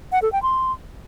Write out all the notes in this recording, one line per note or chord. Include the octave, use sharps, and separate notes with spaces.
F#5
A4
G5
C6